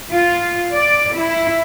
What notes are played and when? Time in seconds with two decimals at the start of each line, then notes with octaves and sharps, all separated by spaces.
0.11 F4
0.74 D5
1.15 E4